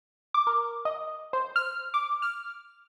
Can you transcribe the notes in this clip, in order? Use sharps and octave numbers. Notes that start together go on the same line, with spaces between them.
D6
A#4
D#5
C5
F6
D6
F6